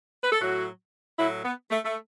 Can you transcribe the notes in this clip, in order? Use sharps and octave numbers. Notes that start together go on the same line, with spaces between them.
B4
A4
A2 F#3 F#4
A2 F#3 E4
B3
A3
A3